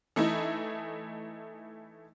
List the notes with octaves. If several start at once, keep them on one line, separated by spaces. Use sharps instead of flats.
E3 A3 D#4 E4